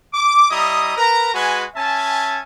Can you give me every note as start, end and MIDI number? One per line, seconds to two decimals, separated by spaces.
0.13 0.47 86
0.50 0.95 55
0.50 0.95 64
0.50 0.95 75
0.50 0.95 82
0.50 0.95 87
0.97 1.31 70
0.97 1.31 71
0.97 1.31 82
1.34 1.63 56
1.34 1.63 66
1.34 1.63 71
1.34 1.63 80
1.75 2.39 61
1.75 2.39 76
1.75 2.39 80
1.75 2.39 81